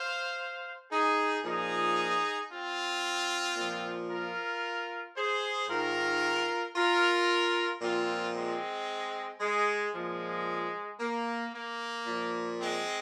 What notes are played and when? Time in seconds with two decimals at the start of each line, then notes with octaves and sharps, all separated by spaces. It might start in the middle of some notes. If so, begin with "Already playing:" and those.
Already playing: C5 F5
0.90 D#4 G#4
1.43 A#2 F3 D#4 G#4
2.50 C4 F4
3.56 A#2 F3
4.09 F4 A#4
5.15 G#4 C5
5.68 G#2 D#3 F4 A#4
6.75 F4 A#4
7.81 A#2 F3 C4 F4
8.34 G#3 C4
9.40 G#3
9.93 A#2 F3 G#3
11.00 A#3
11.53 A#3
12.06 A#2 F3
12.59 G#3 C4